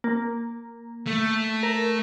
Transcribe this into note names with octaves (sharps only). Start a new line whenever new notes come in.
A#3
A3
A#4